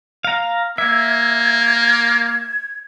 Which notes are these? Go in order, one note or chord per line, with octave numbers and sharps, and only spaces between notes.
F5 A#5
A#3 E5 G#6